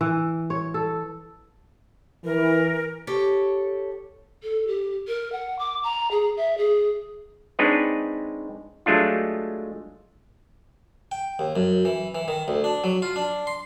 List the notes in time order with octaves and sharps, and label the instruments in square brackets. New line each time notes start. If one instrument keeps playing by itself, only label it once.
[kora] E3
C#5
A4
[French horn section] E3 [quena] A#4
[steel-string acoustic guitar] G4 A4 C#5
[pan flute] A4
G4
A#4
F#5
D6
A#5
G#4
E5
G#4
[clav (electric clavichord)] G#3 C4 D4 D#4 B4 C#5
F#3 G#3 A3 D4 F4
[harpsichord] G5
D#2
F#2
E3
E3
D#3
D2
D4
F#3
F4
D4
C6